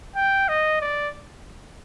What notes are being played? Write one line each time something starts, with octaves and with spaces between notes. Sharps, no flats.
G5
D#5
D5